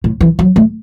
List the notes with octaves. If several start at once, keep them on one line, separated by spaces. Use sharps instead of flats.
A2
E3
F#3
A3